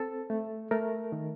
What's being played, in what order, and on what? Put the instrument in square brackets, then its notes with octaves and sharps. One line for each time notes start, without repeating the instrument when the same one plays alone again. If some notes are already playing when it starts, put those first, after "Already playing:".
Already playing: [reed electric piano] C4 A4
A3
A3 A#4
D#3